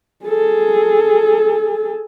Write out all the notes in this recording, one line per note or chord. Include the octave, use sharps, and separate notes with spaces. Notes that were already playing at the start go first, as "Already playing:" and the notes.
G#4 A4